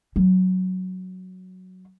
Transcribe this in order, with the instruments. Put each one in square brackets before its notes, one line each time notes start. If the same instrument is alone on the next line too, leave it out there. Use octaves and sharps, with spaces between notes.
[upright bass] F#3 C#4